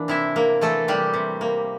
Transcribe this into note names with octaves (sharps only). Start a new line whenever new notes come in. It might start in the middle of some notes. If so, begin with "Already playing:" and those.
Already playing: E3 A#3 D4
C3 E4 E5
A#3
E3 A3 A4
C3 G3 G4
C3
A#3